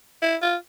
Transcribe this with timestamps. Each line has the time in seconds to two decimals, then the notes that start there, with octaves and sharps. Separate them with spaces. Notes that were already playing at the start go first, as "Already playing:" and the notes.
0.22 E4
0.42 F4